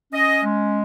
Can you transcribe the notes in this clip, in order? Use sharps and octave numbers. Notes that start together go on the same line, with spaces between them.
C#4 D#5
G#3